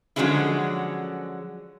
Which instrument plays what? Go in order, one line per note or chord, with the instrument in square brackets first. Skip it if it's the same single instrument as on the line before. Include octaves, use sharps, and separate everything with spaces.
[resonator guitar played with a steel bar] D3 F3 F#3 G#3 C#4 E4